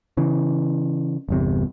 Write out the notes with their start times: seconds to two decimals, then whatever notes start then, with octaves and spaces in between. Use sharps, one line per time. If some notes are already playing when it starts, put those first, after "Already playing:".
0.17 C#3 E3
1.29 G1 E2 C3